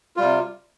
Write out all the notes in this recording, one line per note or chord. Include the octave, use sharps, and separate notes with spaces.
C3 G3 F4